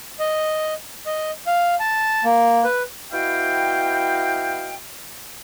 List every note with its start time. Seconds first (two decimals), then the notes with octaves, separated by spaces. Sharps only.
0.19 D#5
1.06 D#5
1.47 F5
1.80 A5
2.24 A#3
2.64 B4
3.12 B3 E4 F#4 D#5 F5 G5